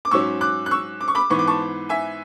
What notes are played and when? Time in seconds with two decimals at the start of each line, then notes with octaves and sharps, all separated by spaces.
0.05 D6
0.11 G#2 F#3 C#4 C#6 E6
0.41 D6 F#6
0.66 F#6
0.71 C#6 E6
1.01 D6
1.08 C#6
1.15 B5 D6
1.30 G#2 E3 B3 C#6
1.39 D6
1.47 A5 C#6
1.89 E5 G#5